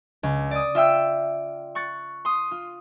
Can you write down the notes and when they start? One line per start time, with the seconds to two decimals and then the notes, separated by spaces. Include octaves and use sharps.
0.23 C#2
0.51 D5 D#6
0.75 F4 E5 G5 E6
1.75 C#6 F#6 A6 C#7
2.25 C6 D#6
2.51 F4